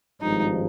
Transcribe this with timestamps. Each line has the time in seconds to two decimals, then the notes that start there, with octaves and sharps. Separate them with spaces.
0.21 G#1 G2 F3 G#3 D#4